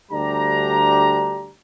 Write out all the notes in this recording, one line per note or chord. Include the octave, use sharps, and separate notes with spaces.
D2 G3 D4 G4 A#5